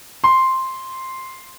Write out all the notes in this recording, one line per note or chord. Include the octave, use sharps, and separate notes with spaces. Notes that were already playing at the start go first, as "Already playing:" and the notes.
C6